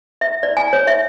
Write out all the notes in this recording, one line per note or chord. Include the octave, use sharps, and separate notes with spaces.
E5
D5
G#5
C#5
E5